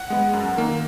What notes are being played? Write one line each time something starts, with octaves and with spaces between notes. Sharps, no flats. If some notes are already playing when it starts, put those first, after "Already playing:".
Already playing: F#5
G#3 B3
F#2
D#3 A#3